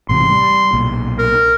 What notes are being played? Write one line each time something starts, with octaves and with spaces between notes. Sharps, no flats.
A1 G#2 C3 C6
G3
B1 A#2
A#4